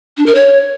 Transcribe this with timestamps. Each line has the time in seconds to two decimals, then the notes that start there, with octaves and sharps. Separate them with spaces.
0.17 D4
0.26 A#4
0.35 C#5